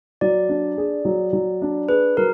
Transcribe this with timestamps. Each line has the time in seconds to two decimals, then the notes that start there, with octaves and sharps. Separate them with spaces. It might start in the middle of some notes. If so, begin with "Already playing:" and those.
0.21 F#3 D5
0.49 D4
0.78 G#4
1.05 F#3
1.33 F#3
1.62 D4
1.89 G#4 B4
2.17 F#3 A#4